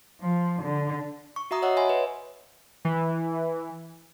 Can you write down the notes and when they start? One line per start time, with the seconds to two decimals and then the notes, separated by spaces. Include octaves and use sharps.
0.20 F3
0.62 D3
1.36 C#6
1.51 F#4 E5 A#5 D#6
1.62 C#5 D#5 F#5 E6
1.77 C#5 E5 G#5 B5 C6
1.89 B4
2.85 E3